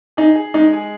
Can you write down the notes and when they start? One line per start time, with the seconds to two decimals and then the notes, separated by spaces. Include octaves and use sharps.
0.17 D#4 G#4
0.35 G#4
0.54 G#3 D#4
0.73 G#4